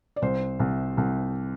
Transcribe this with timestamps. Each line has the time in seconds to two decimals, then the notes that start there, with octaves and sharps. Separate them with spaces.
0.16 D5
0.22 C2 C5
0.59 C2
0.97 C2